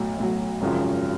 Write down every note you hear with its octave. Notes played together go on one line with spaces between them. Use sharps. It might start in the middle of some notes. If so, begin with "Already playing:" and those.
Already playing: B1 A2 F#3
B1 A2 F#3
G#1 F#2 C#3 F3